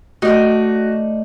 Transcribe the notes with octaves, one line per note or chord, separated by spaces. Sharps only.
A3 D#4 F#4 D5 F6